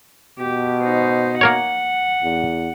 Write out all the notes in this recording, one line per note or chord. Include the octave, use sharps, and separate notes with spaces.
B2 G4
D#4 C5
A#3 A#4 C#5 F#5
E2